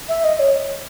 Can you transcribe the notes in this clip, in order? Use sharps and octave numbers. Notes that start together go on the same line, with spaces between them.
E5
D#5
C#5